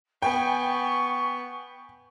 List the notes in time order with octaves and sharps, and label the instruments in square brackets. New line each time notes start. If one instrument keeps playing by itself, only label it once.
[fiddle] B3 [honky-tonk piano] G5 G#5 [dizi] C#6